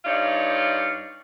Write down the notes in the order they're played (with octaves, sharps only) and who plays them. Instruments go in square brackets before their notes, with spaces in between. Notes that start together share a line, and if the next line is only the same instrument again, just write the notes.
[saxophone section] G2 D#4 F4 C#5 D5